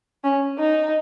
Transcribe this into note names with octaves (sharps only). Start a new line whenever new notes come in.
C#4
D#4